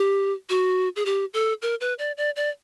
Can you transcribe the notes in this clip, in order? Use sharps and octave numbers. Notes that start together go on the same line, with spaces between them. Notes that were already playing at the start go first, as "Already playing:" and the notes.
Already playing: G4
F#4
G#4
G4
A4
A#4
B4
D5
D5
D5